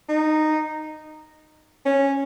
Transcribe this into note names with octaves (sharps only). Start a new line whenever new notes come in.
D#4
C#4